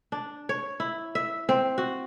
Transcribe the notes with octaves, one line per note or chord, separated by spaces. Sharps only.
D4
C#5
E4
E5
C4
F#4